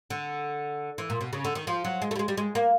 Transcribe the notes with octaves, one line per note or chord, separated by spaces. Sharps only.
D3
E3
A#2
B2
C#3
D3
D#3
F3
F#3
G#3
A3
G3
G#3
G3
G#3
A#3